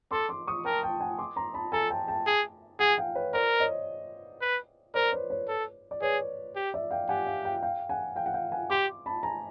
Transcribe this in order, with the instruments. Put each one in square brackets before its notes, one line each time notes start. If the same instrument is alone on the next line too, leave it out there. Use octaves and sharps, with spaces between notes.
[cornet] A4 [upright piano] C6 D6
[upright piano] C6 D6
C#6 D#6
[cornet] A#4 [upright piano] G5 A5
[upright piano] G5 A5
F#5 G#5
C6 D6
A#5 C6
A5 B5
[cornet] A4 [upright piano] G#5 A#5
[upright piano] G5 A5
G5 A5
[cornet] G#4
[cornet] G#4 [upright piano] F#5 G#5
[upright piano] F5 G5
B4 C#5
[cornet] A#4 [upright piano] C5 D5
[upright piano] C#5 D#5
[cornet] B4
[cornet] A#4 [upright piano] C5 D5
[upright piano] B4 C#5
B4 C#5
[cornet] A4
[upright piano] D5
[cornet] G#4 [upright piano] B4 C#5
[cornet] G4
[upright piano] D5 E5
F5 G5
[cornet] G4 [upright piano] F#5 G#5
[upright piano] F5 G5
F5 G5
F5 G5
F#5 G#5
F5 G5
F#5
F5 G5
F#5 G#5
[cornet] G4 [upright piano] C6 D6
[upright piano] A5 B5
G#5 A#5